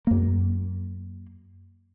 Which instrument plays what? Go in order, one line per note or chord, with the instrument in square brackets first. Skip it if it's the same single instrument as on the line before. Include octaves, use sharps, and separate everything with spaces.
[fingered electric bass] F#2 A#3